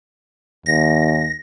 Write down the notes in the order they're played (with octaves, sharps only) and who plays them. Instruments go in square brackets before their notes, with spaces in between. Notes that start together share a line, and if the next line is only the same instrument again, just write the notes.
[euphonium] D#2 [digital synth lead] A#6